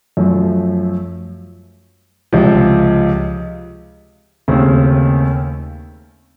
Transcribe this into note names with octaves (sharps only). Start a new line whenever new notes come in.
F#2 F3 A3
C#2 C3 F3
D#2 C#3 A3 C4